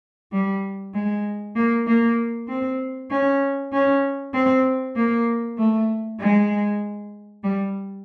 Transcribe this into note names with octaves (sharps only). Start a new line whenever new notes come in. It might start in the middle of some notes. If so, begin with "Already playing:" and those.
G3
G#3
A#3
A#3
C4
C#4
C#4
C4
A#3
A3
G#3
G3